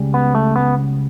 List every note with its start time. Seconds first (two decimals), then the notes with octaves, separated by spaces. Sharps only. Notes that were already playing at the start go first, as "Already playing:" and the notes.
Already playing: C#2 C#3 G3
0.14 B3
0.35 A3
0.56 B3